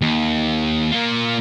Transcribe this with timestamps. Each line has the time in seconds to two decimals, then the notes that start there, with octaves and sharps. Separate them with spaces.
0.02 D#2
0.92 A#3 F4